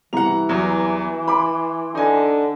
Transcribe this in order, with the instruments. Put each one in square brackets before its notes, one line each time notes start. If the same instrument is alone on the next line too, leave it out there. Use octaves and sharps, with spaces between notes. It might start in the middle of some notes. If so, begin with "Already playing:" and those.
[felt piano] C2 A#5 [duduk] E3 [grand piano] F#5 F7
[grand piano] E2 F#3
[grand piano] B5 [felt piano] C6 D6
[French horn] D3 [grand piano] D#4 G#5